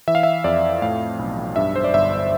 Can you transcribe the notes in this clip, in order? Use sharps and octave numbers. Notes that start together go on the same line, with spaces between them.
E3 E5
F5
E5
F2 D5
A2 F5
B1
G2 E5
C5
D5
G1 E5